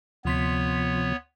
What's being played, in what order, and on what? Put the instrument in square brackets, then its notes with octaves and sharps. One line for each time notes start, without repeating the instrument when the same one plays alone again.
[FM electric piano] D2 C6 B6 [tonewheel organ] C3 F3 [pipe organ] B3 C#5